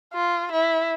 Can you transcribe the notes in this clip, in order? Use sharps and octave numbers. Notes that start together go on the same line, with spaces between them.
F4
E4